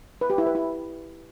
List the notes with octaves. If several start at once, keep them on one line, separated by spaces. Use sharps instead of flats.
B4
G4
E4
B4
E4